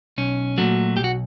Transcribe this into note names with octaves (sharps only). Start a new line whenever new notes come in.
B1 C#4
A#2 F#3 A3 F#4
B1 G4
F#4